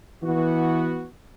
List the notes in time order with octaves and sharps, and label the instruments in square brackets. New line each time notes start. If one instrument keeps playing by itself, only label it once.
[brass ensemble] E3 B3 F#4